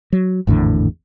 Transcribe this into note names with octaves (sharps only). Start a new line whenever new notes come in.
F#3
G#1 E2 A2 D3